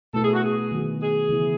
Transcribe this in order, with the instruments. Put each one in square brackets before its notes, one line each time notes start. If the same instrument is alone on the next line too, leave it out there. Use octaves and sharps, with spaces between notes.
[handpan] B2 A3 E4 B4 [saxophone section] A4
[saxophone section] G#4
F#4
G#4
[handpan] D#3 F#3 B3 F#4
[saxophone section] G#4
[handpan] C#3 E3 B3 E4